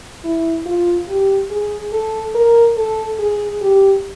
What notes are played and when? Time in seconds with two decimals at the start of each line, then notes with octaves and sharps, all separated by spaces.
0.24 E4
0.66 F4
1.08 G4
1.50 G#4
1.92 A4
2.35 A#4
2.77 A4
3.19 G#4
3.61 G4